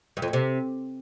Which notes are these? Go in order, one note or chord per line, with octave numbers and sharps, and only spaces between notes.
G2
F2
A2
C3